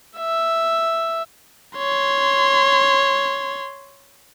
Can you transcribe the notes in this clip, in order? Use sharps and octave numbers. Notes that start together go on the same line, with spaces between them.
E5
C#5 C6